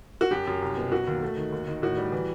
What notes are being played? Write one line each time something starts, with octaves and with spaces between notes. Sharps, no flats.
F#4
F#2 G4
F#2
C2
B2
F#3 F#4
D#2
A3
D#3
D#2
D#3
A2 F#4
G3
E3